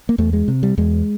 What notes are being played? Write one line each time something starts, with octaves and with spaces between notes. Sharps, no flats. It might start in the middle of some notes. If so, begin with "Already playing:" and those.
A#3
E2 A3
G#3
C3
G3
E2 G#3